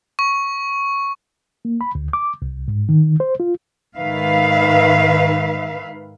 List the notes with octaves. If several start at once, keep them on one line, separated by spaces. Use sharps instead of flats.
C#6
A#3
B5
D2
D6
C2
G#2
D#3
C5
F4
G#2 D#3 B4 E5 F5